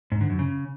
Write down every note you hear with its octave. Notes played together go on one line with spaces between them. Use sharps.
G#2
D3
F#2
C#3